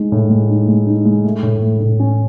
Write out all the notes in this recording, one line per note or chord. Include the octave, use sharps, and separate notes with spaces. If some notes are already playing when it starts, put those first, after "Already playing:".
Already playing: G#3 D#4
A2
G#3
D#4
G#3
D#4
G#3
A3
A2
A3
A2
C#4